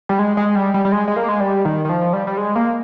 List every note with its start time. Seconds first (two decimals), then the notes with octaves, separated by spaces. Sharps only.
0.09 G3
0.19 G#3
0.37 G#3
0.55 G3
0.74 G3
0.85 G3
0.92 G#3
1.08 G#3
1.16 A#3
1.29 G#3
1.40 G3
1.65 D#3
1.85 D#3
1.89 F3
2.13 G3
2.27 G3
2.37 G#3
2.56 A#3